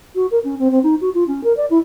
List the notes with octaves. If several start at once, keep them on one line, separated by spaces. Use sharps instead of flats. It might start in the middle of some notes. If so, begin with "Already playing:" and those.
F#4
A#4
C#4
C4
C4
D#4
F#4
F4
C#4
A#4
D5
E4